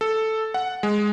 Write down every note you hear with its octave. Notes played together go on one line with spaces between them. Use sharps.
A4
F#5
G#3